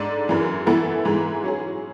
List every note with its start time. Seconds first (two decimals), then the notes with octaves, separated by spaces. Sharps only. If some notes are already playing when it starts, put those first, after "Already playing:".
Already playing: G#2 G#3 D4 A4
0.28 F#2 E3 G#3
0.67 E3 B3 E4 A4
1.05 G#2 E3 G#3
1.44 F#3 C#4 G#4